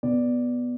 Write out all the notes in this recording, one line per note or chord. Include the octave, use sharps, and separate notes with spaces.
B2 B3 D5